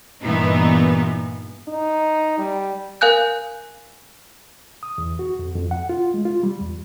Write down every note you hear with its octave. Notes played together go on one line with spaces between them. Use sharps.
G2 A#2 E3 B3 D#4
D#4
G3
A#4 F5 G#5 F#6 G6
D#6
E2
F#4
F2
F2
F#5
F4
G#3
F4
G3
E2